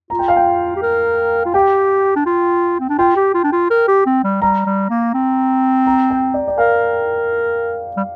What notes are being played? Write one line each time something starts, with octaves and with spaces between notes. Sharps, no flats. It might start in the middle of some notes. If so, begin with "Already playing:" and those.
F4 A#5
G5
F5
G5
G4
A#4
F4
G4 G5
D4
F4
C4
D4
F4 G5
G4
F4
D4
F4
A#4
G4
C4
G3
G3 A#5
G3
A#3
C4
A#5
G5
D5
D5
A#4 F5
G3